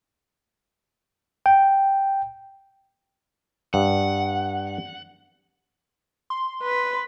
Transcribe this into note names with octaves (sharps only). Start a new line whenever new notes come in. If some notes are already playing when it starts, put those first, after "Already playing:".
G5
G2 F#5
C6
B4